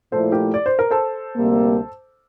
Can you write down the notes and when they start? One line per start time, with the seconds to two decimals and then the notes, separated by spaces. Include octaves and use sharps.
0.12 A#2 F3 A3 E4 A4 C5
0.32 G4 A#4
0.54 D5
0.66 C5
0.79 A#4
0.91 A4 C5
1.36 D2 C3 G3 A#3